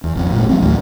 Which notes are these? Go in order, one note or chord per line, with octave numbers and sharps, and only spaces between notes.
E2
G#1 F2
A#2 G#3
F3 F#3 G#3 C4
G#1 D#2 A2 D#3